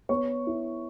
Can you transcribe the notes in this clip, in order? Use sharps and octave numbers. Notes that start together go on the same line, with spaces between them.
B3 C#5 C#6
E4